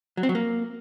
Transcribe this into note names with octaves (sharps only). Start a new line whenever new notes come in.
F#3
C4
F#3
A#3